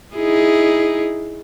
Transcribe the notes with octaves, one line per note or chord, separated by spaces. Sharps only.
D#4 E4 G#4